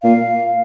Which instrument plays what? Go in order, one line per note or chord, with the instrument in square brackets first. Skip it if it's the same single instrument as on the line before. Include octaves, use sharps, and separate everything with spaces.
[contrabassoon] A#2 [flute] F5